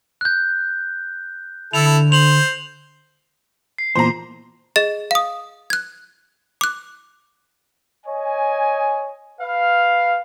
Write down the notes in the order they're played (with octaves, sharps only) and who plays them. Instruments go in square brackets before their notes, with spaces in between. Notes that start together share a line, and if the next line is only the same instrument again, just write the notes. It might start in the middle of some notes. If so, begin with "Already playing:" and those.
[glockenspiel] F#6 G6
[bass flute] D3 [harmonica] E4 A4 [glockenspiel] F7
[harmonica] C5 [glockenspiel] F7 F#7
[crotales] C7
[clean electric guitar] E2 A#2 [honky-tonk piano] C5 A#5
[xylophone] G#4 D#5 A6
F5 D#6
F#6 G#6
D6 F#6
[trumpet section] C#5 D#5 G#5
B4 F5